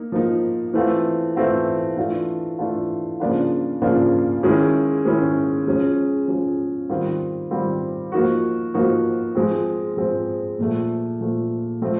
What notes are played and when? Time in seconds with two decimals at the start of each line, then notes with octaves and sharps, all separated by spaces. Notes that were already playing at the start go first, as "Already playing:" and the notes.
Already playing: A#3 D#4
0.12 F3 A#3 D#4
0.74 E3 A3 C4 F4
1.36 E3 A3 C4 F4
1.97 E3 A3 D4 F4
2.59 E3 A3 D4 F4
3.20 C#3 F3 A#3 D4 F4
3.82 C#3 F3 A#3 D4 F4
4.43 D#3 G#3 C#4 E4
5.05 D#3 G#3 C#4 E4
5.67 F3 G#3 C#4
6.28 F3 G#3 C#4
6.90 D#3 G3 C4 F4
7.51 D#3 G3 C4 F4
8.12 F3 A#3 D#4 F#4
8.74 F3 A#3 D#4 F#4
9.35 F3 G#3 C4
9.97 F3 G#3 C4
10.59 A#2 F3 A3
11.20 A#2 F3 A3
11.82 F3 A3 C4